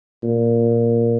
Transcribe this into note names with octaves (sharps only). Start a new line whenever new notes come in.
A#2